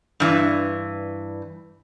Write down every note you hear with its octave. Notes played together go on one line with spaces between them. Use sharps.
G2 E3